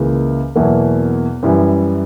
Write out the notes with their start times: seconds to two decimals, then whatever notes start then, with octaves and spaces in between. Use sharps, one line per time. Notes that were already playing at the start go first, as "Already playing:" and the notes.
Already playing: C#2 C#3 E3 A#3
0.56 E2 B2 F#3 A#3 E4
1.43 F#2 E3 G3